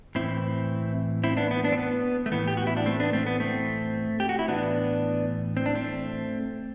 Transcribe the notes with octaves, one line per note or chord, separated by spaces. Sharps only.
A2 E3 C4 E4
C4 E4
B3 D4
B3
B3 D4
C4
B3
A3
A2 E3 B3
G4
F#4
E4
D4
A3 C4
B3 D4
A3 C4
B3
A3 C4
G4
F#4
E4
A2 E3 B3 D4
C4
D4
A3 C4